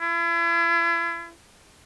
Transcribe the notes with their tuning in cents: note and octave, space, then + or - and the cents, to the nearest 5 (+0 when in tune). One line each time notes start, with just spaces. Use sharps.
E4 +40